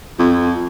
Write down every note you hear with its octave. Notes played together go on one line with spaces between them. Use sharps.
F2